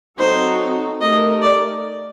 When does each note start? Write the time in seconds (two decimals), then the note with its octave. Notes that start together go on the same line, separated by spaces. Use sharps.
0.19 F#3 C4 D#4 F#4 A4 C5
1.01 A3 D#4 G4 A#4 D#5
1.42 D5